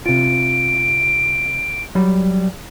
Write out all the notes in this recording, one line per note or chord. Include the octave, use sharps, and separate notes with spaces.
C3 F4 D7
F#3 G3 B5